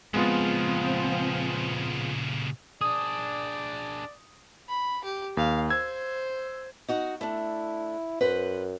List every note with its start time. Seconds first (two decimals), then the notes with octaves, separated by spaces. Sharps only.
0.14 A#2 C#3 F3 G#3 B3 C4 F4
2.81 D4 G#4 D5 D#6
4.68 B5
5.04 G4
5.37 D#2 F5
5.70 C5 E6 G#6
6.88 D#4 F#4 F#5
7.21 A3 D4 E4
8.21 F#2 B4 C5 F#5